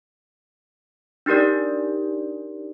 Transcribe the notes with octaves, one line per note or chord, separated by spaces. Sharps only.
D4 D#4 G4 A#4 D5